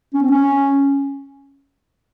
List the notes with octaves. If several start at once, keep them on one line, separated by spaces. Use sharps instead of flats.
C#4
C4
C#4